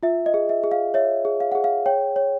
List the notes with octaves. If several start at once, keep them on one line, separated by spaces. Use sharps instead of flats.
F4 E5
D#5
G#4
E5
G#4
F5
C#5 E5
G#4
F5
G#4 F#5
F5
C#5 G5
C#5